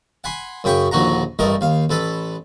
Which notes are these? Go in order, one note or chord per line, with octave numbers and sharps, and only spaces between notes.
F#5 G#5 B5 C6
F#2 C#3 G5 B5 C#6
A#1 D#2 D3 F#4 F#5 A#5
A1 G2 A3 A#4 D#5
D#2 F5
A1 A4 B4